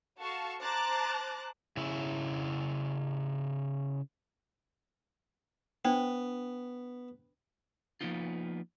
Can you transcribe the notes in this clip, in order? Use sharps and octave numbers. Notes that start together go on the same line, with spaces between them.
F#4 A4 F5 A5 C#6
C5 A5 A#5 D6 F#6 A6
C#3 E4
B3 D4 C5 G5
F3 F#3 A#3 B3 D#4 F4